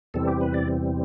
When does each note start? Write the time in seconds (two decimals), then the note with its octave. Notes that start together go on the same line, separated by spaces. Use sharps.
0.14 E2 C3 E3 G3 C4 A4
0.27 G4
0.41 B4
0.54 D5